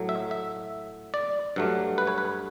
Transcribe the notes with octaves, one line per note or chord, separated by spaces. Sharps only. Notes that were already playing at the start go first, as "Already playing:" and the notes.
Already playing: A2 F#3 A3
E5
E5
D5
G2 F#3 A3
B4
C#5
B4